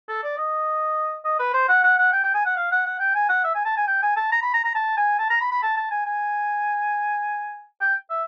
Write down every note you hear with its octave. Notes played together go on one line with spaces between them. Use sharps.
A4
D5
D#5
D#5
B4
C5
F#5
F#5
F#5
G5
G5
G#5
F#5
F5
F#5
F#5
G5
G#5
F#5
E5
G#5
A5
G#5
G5
G#5
A5
A#5
B5
A#5
A#5
A5
G#5
A5
A#5
B5
B5
A5
A5
G#5
G#5
G5
E5